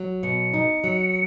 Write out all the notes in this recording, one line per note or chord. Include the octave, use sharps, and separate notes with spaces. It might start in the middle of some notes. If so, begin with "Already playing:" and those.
Already playing: F#3
B2 C#7
D#4
F#3